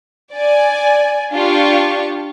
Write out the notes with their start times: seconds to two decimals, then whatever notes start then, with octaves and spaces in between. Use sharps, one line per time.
0.33 D5 G#5
1.33 D4 F4 G4 C#6